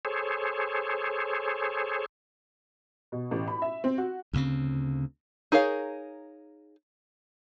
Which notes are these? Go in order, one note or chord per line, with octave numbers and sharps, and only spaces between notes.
G#4 A4 C5 C#5
B2
A1
B5
E5
C4
F#4
D2 C#3 C4
D#4 G#4 A#4 C#5 F5